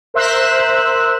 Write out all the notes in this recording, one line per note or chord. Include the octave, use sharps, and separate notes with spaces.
A#4 C5 E5 E6 F#6